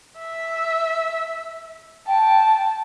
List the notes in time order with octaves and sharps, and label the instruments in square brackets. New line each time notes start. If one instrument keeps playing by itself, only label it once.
[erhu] E5
[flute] G5 [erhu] A5